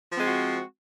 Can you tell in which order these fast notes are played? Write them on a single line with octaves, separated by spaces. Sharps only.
F3 C4 G#3 F#4